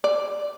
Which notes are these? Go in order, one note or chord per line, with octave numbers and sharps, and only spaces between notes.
D5